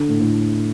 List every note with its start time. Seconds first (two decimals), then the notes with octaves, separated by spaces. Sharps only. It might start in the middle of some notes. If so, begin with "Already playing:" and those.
Already playing: D3
0.09 A2
0.20 A2